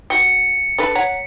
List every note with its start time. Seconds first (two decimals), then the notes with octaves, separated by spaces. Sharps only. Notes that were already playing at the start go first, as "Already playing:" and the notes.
0.10 F#4 G4 C#7
0.78 D4 A4 B4
0.95 C#5 F#5 A#5 B6